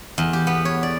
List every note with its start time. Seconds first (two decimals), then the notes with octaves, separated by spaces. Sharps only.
0.18 E2
0.33 G4
0.47 B3
0.65 C#5
0.83 D5